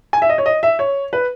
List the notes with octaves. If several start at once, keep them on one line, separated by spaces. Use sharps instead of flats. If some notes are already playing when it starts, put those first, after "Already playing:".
G#5
E5
D#5
C#5
D#5
E5
C#5
B4